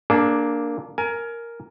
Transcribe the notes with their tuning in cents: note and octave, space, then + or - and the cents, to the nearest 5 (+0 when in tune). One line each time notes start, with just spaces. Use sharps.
A#3 +0 D4 +0 G#4 +45
A#4 +0 G#5 +25